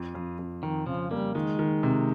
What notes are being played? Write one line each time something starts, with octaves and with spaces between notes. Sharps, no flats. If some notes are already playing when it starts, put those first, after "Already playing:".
Already playing: F2
F2
F2
F2 D#3
C#3 F3
G3 A#3
D#3 G#3
D#3
C3